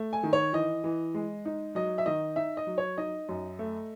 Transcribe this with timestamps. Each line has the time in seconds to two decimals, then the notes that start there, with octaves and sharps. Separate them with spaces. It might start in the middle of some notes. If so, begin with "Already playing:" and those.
Already playing: A3
0.13 G#5
0.23 D#3
0.33 C#5
0.53 E3 D#5
0.84 E3
1.14 G#3
1.45 D#4
1.75 F#3 D#5
1.98 E5
2.06 D#3 D#5
2.36 D#4 E5
2.57 D#5
2.67 F#3
2.78 C#5
2.98 D#4 D#5
3.29 F#2
3.59 A3